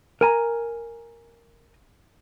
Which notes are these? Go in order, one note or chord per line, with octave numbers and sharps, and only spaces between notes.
A#4 G#5 A#5